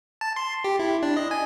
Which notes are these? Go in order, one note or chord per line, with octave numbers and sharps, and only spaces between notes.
A5
C6
G4
E4
D4
D#5
G#5